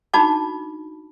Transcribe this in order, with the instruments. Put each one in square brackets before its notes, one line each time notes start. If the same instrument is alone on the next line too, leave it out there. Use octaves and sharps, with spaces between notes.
[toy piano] D4 D#4 F#4 A5 B5 D6